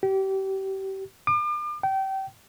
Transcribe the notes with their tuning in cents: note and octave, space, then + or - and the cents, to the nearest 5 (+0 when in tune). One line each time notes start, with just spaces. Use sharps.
G4 -30
D6 +40
G5 -25